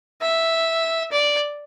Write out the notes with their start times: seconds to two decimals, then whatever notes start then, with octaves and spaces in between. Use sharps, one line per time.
0.22 E5
1.12 D5